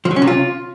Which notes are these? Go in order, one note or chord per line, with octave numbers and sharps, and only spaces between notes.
F3
F#3
C#4
C3
F4